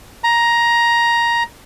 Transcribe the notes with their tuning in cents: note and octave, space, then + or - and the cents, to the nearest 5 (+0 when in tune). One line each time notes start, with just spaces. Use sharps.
A#5 +10